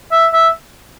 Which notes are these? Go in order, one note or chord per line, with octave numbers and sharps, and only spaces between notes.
E5
E5